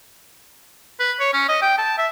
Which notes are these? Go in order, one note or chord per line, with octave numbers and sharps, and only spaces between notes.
B4
C#5
C#4
D#5
G5
A5
E5